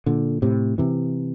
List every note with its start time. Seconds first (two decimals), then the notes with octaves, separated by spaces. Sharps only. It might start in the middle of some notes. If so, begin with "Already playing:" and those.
0.06 A#2 D3
0.42 A2 C3
0.78 C3 E3